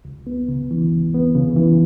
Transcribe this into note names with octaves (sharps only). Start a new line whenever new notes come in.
C#2
B3
C#3
E3
C#2
B3
C#3
E3